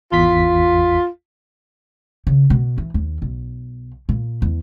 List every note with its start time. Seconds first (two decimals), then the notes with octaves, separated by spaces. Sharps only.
0.12 G#1 E2 F4 B6
2.27 C#3
2.50 B2
2.78 E3
2.94 D#2
3.22 B1
4.09 A#2
4.42 E2